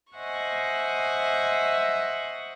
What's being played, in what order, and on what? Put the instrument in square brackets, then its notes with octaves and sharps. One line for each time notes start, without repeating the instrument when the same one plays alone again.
[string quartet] C5 D#5 E5 F#5 G#5 C#6